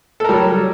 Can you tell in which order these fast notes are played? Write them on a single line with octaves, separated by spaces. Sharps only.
A4 A#4 G3 F#3